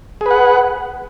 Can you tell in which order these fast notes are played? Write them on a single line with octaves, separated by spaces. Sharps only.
G#4 B4 F#5